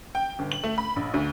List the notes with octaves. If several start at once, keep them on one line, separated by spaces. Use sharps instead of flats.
G5
G1
F#7
A3
B5
A#1
D2